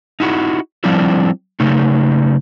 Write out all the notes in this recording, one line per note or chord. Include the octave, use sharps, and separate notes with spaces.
D#4 E4 F#4
F3 G3 C4 D4 E4 F4
C#3 F#3 A3 D#4